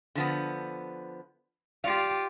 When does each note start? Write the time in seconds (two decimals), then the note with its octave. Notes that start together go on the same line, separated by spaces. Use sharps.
0.15 D3 F3 B3
1.84 F4 G4 D5 F5